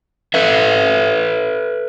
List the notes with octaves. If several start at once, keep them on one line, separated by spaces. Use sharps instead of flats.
A4 B4 E5